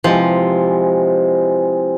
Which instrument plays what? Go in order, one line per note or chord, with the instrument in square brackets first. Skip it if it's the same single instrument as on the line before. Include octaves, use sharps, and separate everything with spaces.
[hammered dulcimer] C3 E3 G#3 [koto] F3